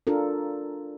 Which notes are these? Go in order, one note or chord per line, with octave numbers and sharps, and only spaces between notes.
D4 F4 A4 A#4